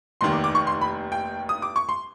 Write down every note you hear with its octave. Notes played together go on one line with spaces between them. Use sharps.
F1 D#2 D#3 C6
D6
D6
C#6
C6
B5
G5
D#6
D6
C#6
C6